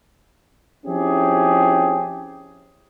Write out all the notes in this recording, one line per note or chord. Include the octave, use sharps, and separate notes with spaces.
F3 C4 C#4 E4 G4 G#4